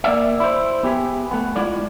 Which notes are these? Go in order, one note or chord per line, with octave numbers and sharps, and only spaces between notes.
A#3 D5 E5
E4 C5
B3 G4 G#4 B4
A3 B3
G#3 E4 F4 C#5 D5